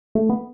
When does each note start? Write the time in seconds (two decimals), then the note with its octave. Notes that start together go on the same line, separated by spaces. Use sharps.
0.15 A3
0.29 B3